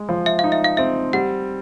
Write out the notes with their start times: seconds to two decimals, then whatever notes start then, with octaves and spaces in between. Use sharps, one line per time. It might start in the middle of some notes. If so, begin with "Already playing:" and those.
Already playing: G#3
0.09 F3
0.26 E5
0.39 D#4 F5
0.52 E5
0.64 F5
0.77 C4 E5
1.13 G3 F#5